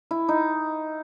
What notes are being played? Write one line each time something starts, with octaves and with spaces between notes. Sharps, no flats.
E4
D#4